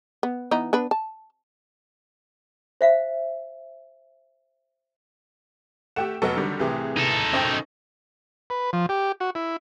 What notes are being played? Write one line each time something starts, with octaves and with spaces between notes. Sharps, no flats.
B3
E3 B3 D#4
B3 D4 B4
A5
C5 E5 F5
A3 G4 F#5 G5 E7
F1 F#3 B3 F#4 A4 D#5
D3 D#3 G3
C2 A2 C3 E3 G4 G#4
D#4 A4
F#2 C5 D#5 G5 C#6
B4
F3
G4
F#4
E4